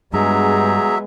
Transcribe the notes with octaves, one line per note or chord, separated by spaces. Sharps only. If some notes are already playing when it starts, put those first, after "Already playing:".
G2 F#3 G#3 B3 G#4 E5 A#5